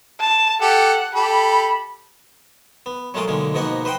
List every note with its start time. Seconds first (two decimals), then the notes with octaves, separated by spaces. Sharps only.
0.20 A5
0.61 G4 A4 F#5
1.14 G4 A4 B5
2.86 B3
3.14 F#3 G#3 A3 F4 A#4 D#5
3.28 B1 D3 G#3 A#3
3.54 G#2 B2 F3 A#3 D#4 F#5
3.85 B4 C5 D#5 F#5 G5